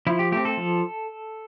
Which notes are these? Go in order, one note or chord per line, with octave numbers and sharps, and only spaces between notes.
F3 E4
G4
A3 C4 G4
A4
F3